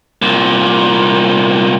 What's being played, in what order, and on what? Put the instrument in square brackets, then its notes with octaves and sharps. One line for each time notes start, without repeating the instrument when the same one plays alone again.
[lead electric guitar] C2 A#2